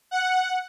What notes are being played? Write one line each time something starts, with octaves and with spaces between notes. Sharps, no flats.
F#5